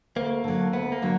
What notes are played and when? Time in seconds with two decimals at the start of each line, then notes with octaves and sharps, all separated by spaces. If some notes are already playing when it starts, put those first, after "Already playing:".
0.16 D2 A#3
0.44 D3 F#3
0.73 D2 B3
0.92 A#3
1.02 D3 F#3